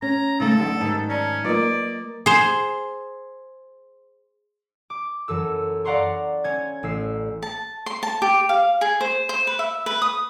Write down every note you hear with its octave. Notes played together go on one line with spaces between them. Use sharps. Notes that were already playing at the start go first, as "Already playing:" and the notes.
C#4 A#5
C#3 G#3 A3 C#4 D#4 A4
E2 D3 F#3 A3 G4
G#2 D#3 A5
C#4 D5 A5 A#5
F#3 A#3 F4 B4 D5 D#5
G#4 C5
D6
F#2 E3 A4 E6
D5 F5 F#5 A#5 C6 C#6
C#4 G#6
A1 E6 C7
A5
C6
A5
G4
F5
G#4
C5
C5
B4
E5
B4
D#6